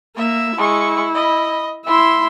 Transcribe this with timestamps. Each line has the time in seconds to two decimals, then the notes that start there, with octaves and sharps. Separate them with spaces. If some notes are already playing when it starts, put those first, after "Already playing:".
0.17 A#3 E5
0.57 G#3 E4 C#6
1.14 D#5 B5
1.86 E4 E5 C6